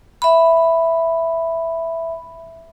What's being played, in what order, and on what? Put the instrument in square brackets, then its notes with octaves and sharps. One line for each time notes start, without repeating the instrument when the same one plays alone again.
[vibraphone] E5 B5